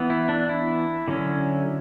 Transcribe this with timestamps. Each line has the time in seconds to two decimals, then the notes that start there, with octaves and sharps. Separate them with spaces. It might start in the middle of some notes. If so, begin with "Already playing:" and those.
Already playing: E3 B3
0.10 E4
0.29 D4
0.49 E4
1.08 D3 F#3 C#4